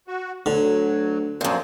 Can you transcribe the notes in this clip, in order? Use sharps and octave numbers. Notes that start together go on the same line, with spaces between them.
F#4
D2 D3 F#3
F#2 A#2 F3 C4